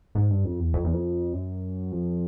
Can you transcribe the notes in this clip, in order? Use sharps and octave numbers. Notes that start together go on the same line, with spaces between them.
G#2
G2
F2
E2
F2
E2
F2
F#2
F2